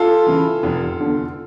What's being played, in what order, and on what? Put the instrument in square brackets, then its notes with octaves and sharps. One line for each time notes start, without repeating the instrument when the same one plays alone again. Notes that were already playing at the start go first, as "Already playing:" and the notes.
Already playing: [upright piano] F4 A4
C#3 E3
F1
E2 D3